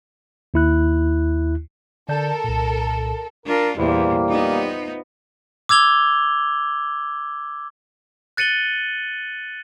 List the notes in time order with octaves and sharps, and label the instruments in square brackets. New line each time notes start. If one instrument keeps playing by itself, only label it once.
[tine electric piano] D#2 E4 F#6
[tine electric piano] D3 D5 G6 [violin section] A4 A#4
[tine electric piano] C2 A#2
[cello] D4 F4 [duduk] A#4
[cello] E2 A#2 [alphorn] G3 [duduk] A#3 [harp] E4 B4 C5
[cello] B3 D#4 [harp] F4
[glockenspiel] D6 E6 G#6 F7 G7
F#6 A6 C#7 D#7 F#7 G7